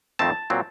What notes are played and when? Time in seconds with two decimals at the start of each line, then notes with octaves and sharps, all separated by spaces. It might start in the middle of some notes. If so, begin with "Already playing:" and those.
0.19 F2 D#3 A3 C4 A5
0.50 A#2 F#3 C4